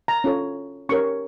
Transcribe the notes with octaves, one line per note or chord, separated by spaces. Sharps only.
A#5
C#4 F4 A4 C#5
C#4 G4 A#4 C#5 C#6